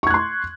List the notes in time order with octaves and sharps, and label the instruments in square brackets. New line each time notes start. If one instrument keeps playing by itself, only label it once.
[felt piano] C#6
G#6
F#6
C6